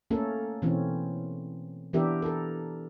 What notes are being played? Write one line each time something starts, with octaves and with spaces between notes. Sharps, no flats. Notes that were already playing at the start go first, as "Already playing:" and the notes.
A3 A#3 C#4 A4 A#4
B2 E3 C4 C#4
E3 B3 D4 G4 A#4 E5
A4 A#4